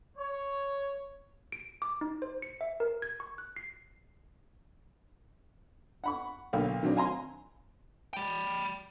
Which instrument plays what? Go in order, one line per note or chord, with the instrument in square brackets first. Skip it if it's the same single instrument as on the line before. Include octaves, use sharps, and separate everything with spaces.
[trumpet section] C#5
[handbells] D7
D6
D#4
C5
C#7
E5
A#4
G#6
C#6
F#6
C7
[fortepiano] F#5 B5 C#6
B1 D3 A#3 F5
D#3 F#3 C4 D4
F5 G#5 A#5 C6
[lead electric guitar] G5 B5